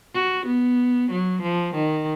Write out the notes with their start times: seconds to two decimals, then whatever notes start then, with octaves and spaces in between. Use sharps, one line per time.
0.14 F#4
0.46 B3
1.11 F#3
1.42 F3
1.74 D#3